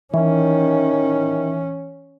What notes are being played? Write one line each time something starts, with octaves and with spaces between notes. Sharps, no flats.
D#3 E3 C#4